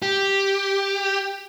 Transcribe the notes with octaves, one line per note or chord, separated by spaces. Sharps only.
G4